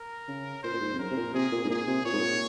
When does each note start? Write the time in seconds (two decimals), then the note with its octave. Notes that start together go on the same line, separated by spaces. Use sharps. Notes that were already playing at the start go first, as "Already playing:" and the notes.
Already playing: A#4
0.28 C#3
0.63 A#2 C5
0.73 A#2
0.80 G#2
0.93 F2
0.99 F#2 A#4
1.11 C3
1.17 A#2
1.34 C3 G#4
1.52 A#2
1.65 G#2
1.70 A#2 G#4
1.88 C3
2.05 A#2 C#5
2.13 G#2
2.20 A#2